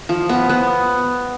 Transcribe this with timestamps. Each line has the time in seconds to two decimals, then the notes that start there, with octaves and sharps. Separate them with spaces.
0.09 F3
0.29 B3
0.49 B3